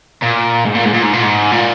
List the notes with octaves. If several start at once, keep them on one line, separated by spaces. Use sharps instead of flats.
A#2
G#2
A#2
G#2
A#2
G#2
A#2
G#2
A#2